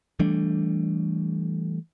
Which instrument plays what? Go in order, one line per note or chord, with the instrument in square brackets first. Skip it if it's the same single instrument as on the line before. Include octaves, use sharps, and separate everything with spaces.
[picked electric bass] E3 G3 A3 D4